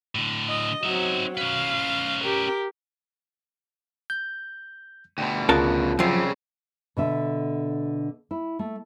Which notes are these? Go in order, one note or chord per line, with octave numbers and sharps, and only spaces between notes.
A2 D3
D#5
F#3 C4 D#4 E5
C#4 B4 F5
G4 A#4
G6
D2 B2 G5
C#2 C#3 F4 A#4 A5 F#6
C2 F#2 C#3 F3 G5 E6 C7
B2 D3 E5
E4
A3